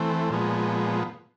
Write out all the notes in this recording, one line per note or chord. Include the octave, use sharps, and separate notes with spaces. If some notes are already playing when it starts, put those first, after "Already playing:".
Already playing: E3 A3 C4
A#2 F3 G#3 B3